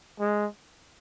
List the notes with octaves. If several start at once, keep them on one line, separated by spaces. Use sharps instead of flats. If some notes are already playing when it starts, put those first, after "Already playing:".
G#3